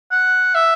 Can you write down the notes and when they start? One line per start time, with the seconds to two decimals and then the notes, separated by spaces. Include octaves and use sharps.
0.11 F#5
0.54 E5